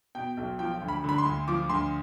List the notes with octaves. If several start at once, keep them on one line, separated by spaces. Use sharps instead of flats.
B2 G5
B1
F3 G5
D2
B5
D3 B5
C6
D2
F3 D6
D2 C6